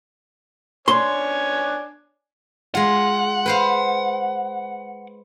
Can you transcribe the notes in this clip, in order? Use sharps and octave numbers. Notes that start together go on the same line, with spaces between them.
D4 C#5 G#5 C6
G#3 F4 F#5
B4 C5 F5